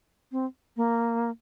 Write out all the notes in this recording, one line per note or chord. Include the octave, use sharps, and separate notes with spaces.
C4
A#3